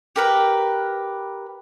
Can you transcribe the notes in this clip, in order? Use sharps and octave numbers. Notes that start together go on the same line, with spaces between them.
G4 A#4 B4